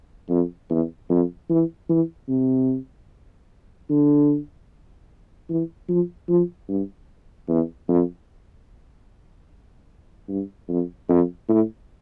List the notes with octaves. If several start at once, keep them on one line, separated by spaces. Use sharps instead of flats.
F2
E2
F2
E3
E3
C3
D3
E3
F3
F3
G2
E2
F2
G2
F2
F2
A2